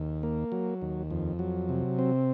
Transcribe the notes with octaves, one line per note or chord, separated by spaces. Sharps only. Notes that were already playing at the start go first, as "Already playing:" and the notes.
Already playing: D#2
A#3
F#3
D#2
F2
F#3
C3
C4